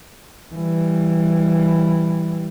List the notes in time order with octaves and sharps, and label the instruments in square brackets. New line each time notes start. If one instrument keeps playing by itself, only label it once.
[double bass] E3 G3